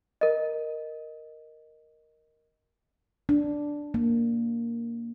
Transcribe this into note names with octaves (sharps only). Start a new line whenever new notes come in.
A#4 D#5
D4
A#3